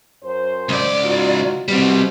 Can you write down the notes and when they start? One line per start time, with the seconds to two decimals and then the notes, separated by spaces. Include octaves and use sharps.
0.24 F#2 C5
0.69 C#2 D5
1.04 D#4 F4 F#4
1.68 B2 G3 C4